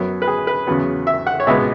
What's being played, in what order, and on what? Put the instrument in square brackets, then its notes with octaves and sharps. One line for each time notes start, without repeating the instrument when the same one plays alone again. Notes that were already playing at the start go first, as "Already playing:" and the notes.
Already playing: [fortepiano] F#2 F#3 B3
B4
G#4
B4
E2 C#3 F#3 B3
E5
F#5
C#5
C#2 B2 G#3 B3 E5